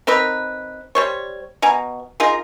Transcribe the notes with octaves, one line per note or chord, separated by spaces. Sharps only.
C4 D#4 A#4 B4
G3 C5 C#5
B2 G#5 A#5
D#4 F4 G#4 A#4